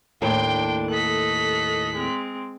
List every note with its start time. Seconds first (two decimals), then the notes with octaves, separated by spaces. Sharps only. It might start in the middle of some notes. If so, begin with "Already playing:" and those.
0.22 D#2 A2 D4 G5 C6
0.90 A4 D#5 F#6 B6
1.94 G#3 C4